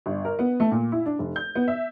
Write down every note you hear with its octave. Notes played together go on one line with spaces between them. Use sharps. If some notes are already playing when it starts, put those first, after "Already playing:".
G1
A#4
B3
A3
A#2
E4
D4
F1
G6
B3
E5